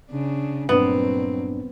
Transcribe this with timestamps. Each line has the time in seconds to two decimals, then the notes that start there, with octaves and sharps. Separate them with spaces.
0.10 C#3 D4
0.69 G2 A#2 F#3 B3 C4 D4